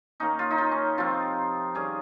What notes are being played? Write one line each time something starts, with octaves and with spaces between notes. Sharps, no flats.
D#3 A#3 C#4 D#4
F4
D#4
F4
C#4
C3 F3 C4 F4
D#3 G3 C#4 G#4